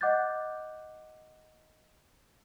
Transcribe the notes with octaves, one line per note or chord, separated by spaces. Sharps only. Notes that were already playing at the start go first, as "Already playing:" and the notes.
D#5 F#5 D6 F#6 G6 A6